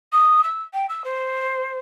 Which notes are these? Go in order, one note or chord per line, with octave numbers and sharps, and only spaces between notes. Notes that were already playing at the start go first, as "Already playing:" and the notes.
D#6
E6
G5
E6
C5